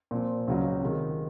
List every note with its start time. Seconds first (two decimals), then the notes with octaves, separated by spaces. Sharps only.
0.11 A#2 F3 C4
0.48 C#2 C#3 F#3 C#4 F4
0.83 C3 D#3 G#3